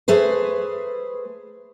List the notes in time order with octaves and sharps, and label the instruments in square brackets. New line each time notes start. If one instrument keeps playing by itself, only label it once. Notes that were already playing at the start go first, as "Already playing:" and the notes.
[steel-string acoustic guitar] A3 G#4 B4 C5